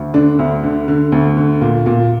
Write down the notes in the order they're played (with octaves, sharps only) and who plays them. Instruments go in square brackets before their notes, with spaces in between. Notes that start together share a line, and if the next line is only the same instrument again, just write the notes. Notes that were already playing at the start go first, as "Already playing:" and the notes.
Already playing: [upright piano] D2
D3 D4
D2
D3
D3
D2
D3
A#2
A#2